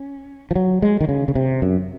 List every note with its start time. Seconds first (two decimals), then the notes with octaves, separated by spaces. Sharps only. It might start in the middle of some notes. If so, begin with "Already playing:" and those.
Already playing: C#4
0.51 F3
0.56 F#3
0.82 G#3
1.01 D#3
1.09 C#3
1.28 C#3
1.35 C3
1.62 F#2